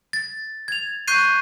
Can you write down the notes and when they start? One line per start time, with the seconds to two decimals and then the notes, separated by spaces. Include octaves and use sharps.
0.13 A6
0.68 G#6 F7
1.08 C#6 F#6 G6 C7 D#7